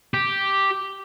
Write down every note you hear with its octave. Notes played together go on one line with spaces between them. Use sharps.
G4